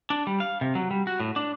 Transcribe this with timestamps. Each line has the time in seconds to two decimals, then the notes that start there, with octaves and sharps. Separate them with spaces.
0.10 D4
0.27 G3
0.40 F5
0.61 C3
0.75 F#3
0.91 G3
1.07 F#4
1.20 A2
1.36 D4